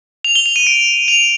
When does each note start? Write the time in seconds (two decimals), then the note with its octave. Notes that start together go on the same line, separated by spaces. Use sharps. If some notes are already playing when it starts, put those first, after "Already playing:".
0.25 F7
0.35 G7
0.46 F7
0.56 D#7
0.67 D7
1.08 F7